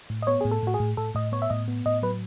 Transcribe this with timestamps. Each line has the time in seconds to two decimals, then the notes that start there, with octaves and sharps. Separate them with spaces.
0.10 A2
0.22 D#5
0.27 B3 C#5
0.41 A2 G#4
0.52 A4
0.63 A2 F#4
0.74 G#4
0.80 A2
0.97 A2 A4
1.15 A2 D#5
1.32 B3 C#5
1.42 E5
1.50 A2 D#5
1.68 B3
1.86 A2 D#5
2.03 F#3 B4